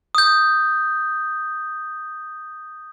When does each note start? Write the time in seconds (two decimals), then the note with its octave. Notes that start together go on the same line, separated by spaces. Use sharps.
0.15 D#6 G6